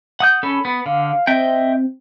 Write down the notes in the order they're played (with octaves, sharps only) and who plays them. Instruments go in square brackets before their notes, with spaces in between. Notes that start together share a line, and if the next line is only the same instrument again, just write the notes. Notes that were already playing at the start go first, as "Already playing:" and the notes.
[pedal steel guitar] F#5 D#6 G6
[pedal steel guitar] C#4 A4 [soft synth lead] B5
[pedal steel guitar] B3
[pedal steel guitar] D3 [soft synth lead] F5
[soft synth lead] C4 [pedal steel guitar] D#5 E5 G5